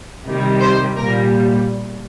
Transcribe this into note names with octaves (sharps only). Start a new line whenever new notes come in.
C3 D#3 G3
C5
A#2 G3 A#4